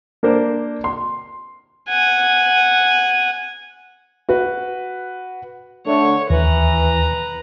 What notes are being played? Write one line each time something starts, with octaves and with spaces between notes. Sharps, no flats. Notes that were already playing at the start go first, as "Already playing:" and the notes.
A#3 D4 A#4 C5
C6
F#5 G#5
F#4 B4
D3 A3 C#5
D#2 E3 B4 A#5